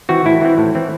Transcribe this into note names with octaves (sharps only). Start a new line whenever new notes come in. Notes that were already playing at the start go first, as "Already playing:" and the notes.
E3 C4 F#4
A2 E4
E3 C4
A2
E3 C4